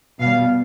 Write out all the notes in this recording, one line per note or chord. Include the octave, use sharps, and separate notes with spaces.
B2 G3 F5